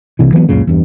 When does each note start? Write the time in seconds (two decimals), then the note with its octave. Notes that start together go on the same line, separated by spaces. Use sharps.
0.19 C2 C3 E3
0.33 E3 F#3 A3 B3
0.49 C#2 F#2 A#2 C#3
0.67 E2 G2